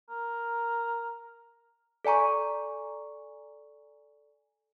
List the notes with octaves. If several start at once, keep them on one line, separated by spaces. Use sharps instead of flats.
A#4
A4 D5 G#5 A#5 C#6